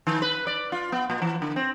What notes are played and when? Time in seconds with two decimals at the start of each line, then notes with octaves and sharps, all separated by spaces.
0.07 D#3
0.22 B4
0.47 D5
0.72 F4
0.92 B3
1.10 A#2
1.22 E3
1.42 D3
1.56 C4